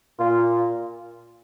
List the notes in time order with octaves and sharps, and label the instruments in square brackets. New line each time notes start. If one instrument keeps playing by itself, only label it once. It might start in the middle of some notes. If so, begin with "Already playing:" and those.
[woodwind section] A#2 [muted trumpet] F4